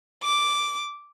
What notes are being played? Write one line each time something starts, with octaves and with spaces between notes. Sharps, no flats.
D6